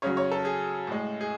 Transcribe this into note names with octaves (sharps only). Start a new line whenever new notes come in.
C#3 F#3 C#5
C#5
A4
G#4
A2 G#3
G#4